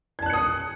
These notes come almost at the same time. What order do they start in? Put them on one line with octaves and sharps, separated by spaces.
G#6 A5 F#6 C#7 D#6